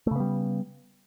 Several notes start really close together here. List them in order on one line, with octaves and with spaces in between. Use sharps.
A3 C#3 B3 G3